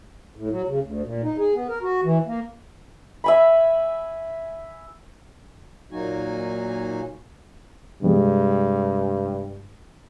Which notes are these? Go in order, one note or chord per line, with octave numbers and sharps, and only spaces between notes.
A2
F#3
C#3
D2
A#2
D#4
G#4
B3
A#4
F#4
E3
A#3
E5 G#5 B5
A#2 F#3 A#3 D#4 F#4 G#5
G2 C3 G3 G#3